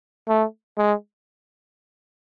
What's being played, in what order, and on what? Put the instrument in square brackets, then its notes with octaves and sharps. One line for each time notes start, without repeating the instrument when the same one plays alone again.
[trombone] A3
G#3